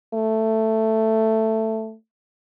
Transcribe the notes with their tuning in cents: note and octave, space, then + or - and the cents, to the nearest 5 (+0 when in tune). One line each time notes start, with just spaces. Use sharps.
A3 +10